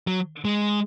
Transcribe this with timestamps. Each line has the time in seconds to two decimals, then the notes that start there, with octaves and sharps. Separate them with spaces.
0.07 F#3
0.45 G#3